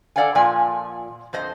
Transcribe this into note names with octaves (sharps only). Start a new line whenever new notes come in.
A4 B4 D5 F5 F#5 G#5
A#2 F3 D5 G#5
F2 C5 D#5